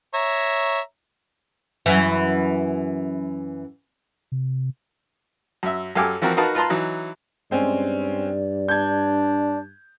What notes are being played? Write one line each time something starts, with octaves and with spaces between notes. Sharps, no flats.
C#5 E5 A#5
F#2 E3
C3
F#2 E5
F#2 G4 A4 F5 G#5 D6
E3 F3 C4 F#4 A#4
D#4 F#4 A#4 B4 F5 A5
F4 B4 A5 A#5 C6
E3 F#3 D#4
G2 G#3 C4 C#4 D5
D4 G6 G#6